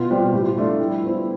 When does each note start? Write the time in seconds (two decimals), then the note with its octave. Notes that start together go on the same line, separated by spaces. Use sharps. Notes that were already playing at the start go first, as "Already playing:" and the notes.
Already playing: B2 F4
0.10 G3 C4
0.32 A2 G4
0.44 F4
0.56 F3 A3 D4 F4
0.79 G3 E4
1.03 B3 F4 C5